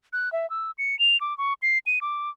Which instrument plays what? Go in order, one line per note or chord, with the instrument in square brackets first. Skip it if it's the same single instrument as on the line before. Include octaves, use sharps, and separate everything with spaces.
[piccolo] F#6
E5
E6
C#7
F7
D6
C#6
C7
D#7
D6